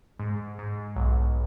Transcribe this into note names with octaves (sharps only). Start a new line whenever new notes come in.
G#2
G#2
B1